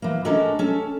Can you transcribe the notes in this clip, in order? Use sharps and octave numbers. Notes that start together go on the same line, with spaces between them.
E3 A#3
G#3 C#4 D4 A4 A#4
C#4 A4